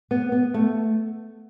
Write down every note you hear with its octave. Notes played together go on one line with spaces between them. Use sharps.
B3
B3
A3